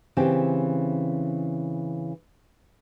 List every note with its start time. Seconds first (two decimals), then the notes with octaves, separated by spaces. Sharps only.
0.17 C#3 E3 C4 G4